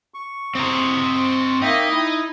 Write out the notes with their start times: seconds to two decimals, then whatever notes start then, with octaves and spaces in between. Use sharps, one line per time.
0.14 C#6
0.55 C4 C5 D#5 A#5
1.62 A#3 D#4 D#5 E5 G5
1.91 E4